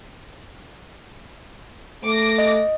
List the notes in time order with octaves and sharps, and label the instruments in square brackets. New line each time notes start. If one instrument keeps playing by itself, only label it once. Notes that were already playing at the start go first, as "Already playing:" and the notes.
[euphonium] A3 [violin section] D6 A#6
[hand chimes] D#5